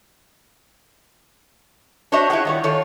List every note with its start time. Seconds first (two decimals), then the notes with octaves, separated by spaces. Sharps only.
2.12 D4 F#4 C5 C#5 D#5 E5
2.30 E4 F4 G4 G#4 F#5
2.45 D#3 G3 C#5
2.64 D#3 F4 A4 C#5